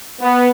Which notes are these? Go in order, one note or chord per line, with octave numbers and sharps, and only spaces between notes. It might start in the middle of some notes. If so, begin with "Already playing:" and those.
B3